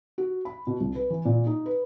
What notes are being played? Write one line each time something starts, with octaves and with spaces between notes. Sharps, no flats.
F#4
B5
B2
C2
B4
E3
A#2
D#4
B4